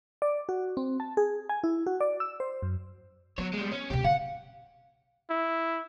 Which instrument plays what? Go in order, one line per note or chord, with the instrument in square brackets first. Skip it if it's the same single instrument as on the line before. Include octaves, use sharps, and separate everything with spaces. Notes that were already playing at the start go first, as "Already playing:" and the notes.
[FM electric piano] D5
F#4
C4
A5
G#4
G#5
E4
F#4
D5
E6
C5
F#2
[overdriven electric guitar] F#3 C#5 [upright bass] B3
[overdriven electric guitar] G3 G#3
C#4
[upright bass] D2 C3 [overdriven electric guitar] G4
[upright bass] C#3 [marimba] F5 [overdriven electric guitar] F#5
[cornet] E4